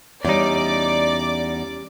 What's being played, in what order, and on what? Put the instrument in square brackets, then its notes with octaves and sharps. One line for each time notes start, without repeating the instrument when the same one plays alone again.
[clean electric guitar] E2 D#4 [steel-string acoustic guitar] G3 C#4 [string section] D5 D6